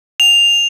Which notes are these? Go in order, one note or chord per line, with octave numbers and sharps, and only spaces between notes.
F7